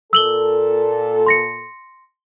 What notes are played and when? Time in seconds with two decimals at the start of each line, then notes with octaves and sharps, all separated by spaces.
0.13 A#2 A4 E6 F#7 G7
1.26 C6 A#6 C#7